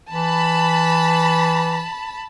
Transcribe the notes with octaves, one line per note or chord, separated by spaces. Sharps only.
E3 A5 B5